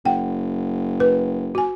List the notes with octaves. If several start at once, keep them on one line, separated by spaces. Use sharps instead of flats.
F#1 F#5 G5
B4
F#4 G#5